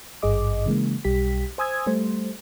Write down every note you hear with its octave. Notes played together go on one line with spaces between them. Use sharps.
G#1 G2 G#4 D#5 D6
C#3 E3 G#3 A#3
B1 G3 G4 B6
C5 G#5 D#6 E6 G#6
G3 A3 C5